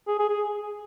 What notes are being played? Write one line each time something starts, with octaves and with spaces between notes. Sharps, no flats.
G#4
G#4
G#4